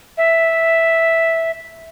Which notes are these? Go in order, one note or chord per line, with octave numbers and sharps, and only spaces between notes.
E5